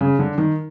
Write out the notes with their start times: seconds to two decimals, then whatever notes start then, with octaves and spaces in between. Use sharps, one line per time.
0.01 C#3
0.19 D3
0.38 D#3